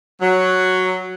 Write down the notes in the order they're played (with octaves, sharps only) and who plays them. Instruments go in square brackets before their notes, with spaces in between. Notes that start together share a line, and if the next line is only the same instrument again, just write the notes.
[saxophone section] F#3